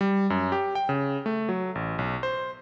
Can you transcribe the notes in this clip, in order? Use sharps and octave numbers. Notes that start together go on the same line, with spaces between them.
G3
F#2
G4
G5
C#3
A3
F#3
A1
B1
C5